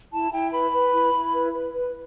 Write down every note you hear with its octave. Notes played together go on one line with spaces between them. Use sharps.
E4 A5
E4 G5
B4 B5
B4
E4
E4
B4
B4
B4